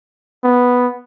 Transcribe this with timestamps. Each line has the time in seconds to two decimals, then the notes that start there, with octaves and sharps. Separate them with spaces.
0.44 B3